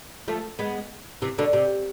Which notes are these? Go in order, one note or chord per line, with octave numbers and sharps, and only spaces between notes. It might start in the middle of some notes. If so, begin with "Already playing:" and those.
F3 A3
G#3 B3
C3 E3
B2 D3
C3